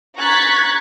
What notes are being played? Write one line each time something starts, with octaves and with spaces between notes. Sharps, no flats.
A#5 C#6 F#6 G#6 A6 B6